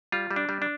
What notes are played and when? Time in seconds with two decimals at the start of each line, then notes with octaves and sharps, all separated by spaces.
0.12 G3 F4
0.31 G3
0.36 D4
0.49 G3
0.62 D4